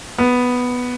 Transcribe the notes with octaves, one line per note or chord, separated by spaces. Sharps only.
B3